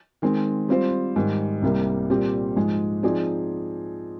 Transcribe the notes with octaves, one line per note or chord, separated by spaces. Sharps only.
D#3 G#3 C4
G3 C4 F4 C5
G#2 D#3 G3
C2 C3 G3 A#3
A#2 G3 C4 G4
G#2 F3 G#3
F3 C4 D#4 G#4 D5